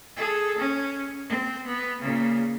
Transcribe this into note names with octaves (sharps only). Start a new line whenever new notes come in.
G#4 A4
C#4
C4
B3
A#2 C#3